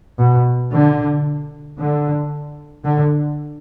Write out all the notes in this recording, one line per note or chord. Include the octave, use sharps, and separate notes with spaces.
B2
D3
D3
D3